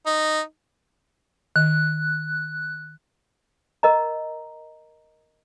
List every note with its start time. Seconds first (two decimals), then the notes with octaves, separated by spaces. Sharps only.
0.06 D#4
1.56 D#3 F#6
3.83 A#4 D#5 A#5